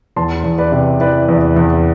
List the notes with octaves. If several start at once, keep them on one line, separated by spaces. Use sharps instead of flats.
E2 A5 C6
E2
B4 D5
C3
E3 B4 D5
E2
E2